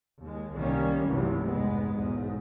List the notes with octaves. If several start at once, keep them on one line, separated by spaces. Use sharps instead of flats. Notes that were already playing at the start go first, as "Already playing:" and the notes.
D#2 G#3
C2 D#3 G3 A#3 C#4
F1 C2 G2 C3 E3 F#3
F1 G#2 G#3 B3
B1 E2 G#2